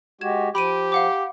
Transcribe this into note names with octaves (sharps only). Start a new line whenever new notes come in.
G#3 F#4 G4 G#6 E7
F3 G4 B5 D7 D#7
F5 F#5 D6